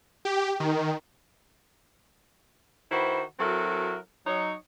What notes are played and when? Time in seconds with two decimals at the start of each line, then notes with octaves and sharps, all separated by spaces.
0.25 G4
0.60 D#3
2.91 D#3 E4 F#4 B4 C5
3.39 F#3 C4 E4 F#4 A4 A#4
4.26 F#3 D#4 C#5